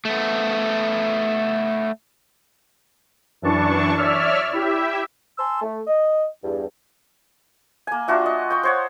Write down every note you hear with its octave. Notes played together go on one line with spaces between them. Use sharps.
A3 B3
F#2 E3 D4 A5 C#6
C#5 D5 E5 E6 F6
E4 G4 E5
G#5 A5 C6 E6
A3
D#5
E2 G2
A#3 G#5
D4 F4 F#4 E5
D#5
G5 C#6
C5 C#5 F#5